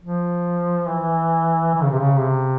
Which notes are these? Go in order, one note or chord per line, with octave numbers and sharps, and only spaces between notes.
F3
E3
E3
C#3
C3
C#3
C3